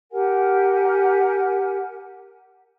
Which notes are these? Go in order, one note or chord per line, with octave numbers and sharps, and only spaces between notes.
G4 A#4 F#5 G#5